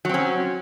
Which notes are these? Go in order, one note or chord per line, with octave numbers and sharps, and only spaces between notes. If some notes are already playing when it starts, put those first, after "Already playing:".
F#3 C4 C#4